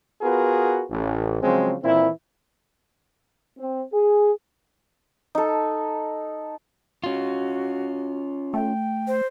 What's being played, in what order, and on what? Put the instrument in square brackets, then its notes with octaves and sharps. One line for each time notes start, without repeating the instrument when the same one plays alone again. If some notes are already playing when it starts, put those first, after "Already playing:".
[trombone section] B3 F4 F#4 G#4 A#4 B4
A1
C#3 F3 F#3 G#3 C4
A#2 D#3 E3 C4 E4
[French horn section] C4
G#4
[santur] D#4 A4
[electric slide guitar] C#4 F4 [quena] F#4
[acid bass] A3 [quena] G5
[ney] C5